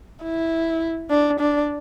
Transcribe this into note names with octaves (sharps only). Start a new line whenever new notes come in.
E4
D4
D4